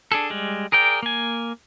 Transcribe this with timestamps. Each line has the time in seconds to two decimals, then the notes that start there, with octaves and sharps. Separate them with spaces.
0.12 D4 G#4 A4
0.30 G3 G#3
0.72 G#4 A#4 D5 G5
1.03 A#3 G#5